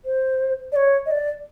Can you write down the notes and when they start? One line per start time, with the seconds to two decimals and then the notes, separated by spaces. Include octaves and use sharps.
0.05 C5
0.72 D5
0.76 C#5
1.06 D#5
1.11 D5